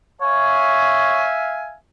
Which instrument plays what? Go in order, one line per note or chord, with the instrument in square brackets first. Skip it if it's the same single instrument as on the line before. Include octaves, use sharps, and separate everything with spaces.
[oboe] C#5 [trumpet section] E5 F5 G#5